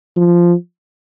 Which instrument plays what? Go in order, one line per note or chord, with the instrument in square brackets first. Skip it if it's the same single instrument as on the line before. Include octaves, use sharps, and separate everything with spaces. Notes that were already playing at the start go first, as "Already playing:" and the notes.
[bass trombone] F3